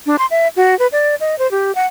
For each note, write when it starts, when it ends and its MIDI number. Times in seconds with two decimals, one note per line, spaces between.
0.06 0.16 62
0.19 0.26 84
0.31 0.48 76
0.56 0.77 66
0.79 0.87 71
0.92 1.15 74
1.20 1.38 75
1.39 1.49 72
1.51 1.74 67
1.75 1.86 78